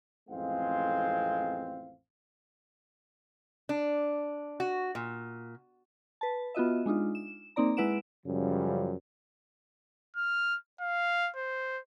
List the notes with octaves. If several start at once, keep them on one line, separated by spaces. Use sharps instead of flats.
A1 F2 G#3 C4 F5
D4
F#4
A#2
B4 A5
B3 F4 F#4 D#5 E5
G#3 D4 D#4 F4
E7
A#3 C4 D#4 D5 A#5
G#3 E4 B4 F#5 D7 E7
F#2 C#3 F3 G3
F6
F5
C5